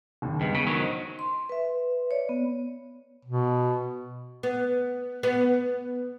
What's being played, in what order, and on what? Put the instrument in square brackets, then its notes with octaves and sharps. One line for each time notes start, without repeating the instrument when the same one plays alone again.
[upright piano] F#1 D#2
[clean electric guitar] G2 [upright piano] G#3 B3
[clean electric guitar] C#3 [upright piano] B6
[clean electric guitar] D#3 F#3 [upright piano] C#6 C#7
[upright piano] D#4 C5
[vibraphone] C6
B4 E5
C#5 D5
B3
[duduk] B2
[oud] B3
B3